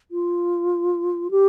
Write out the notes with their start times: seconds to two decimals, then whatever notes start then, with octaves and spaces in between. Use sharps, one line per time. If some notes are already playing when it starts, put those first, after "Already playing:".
0.11 F4
1.31 G4